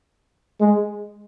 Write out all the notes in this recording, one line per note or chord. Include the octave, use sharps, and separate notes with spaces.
G#3